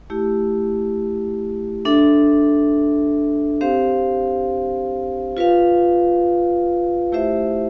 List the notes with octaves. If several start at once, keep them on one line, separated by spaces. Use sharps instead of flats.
A3 E4 G4
D4 A4 E5
C4 G4 C5 F5
F4 B4 F5
A3 E4 G4 C5 E5